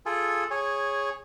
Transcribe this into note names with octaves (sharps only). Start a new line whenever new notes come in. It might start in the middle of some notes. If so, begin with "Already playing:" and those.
F4 G#4 A4
G#4 C#5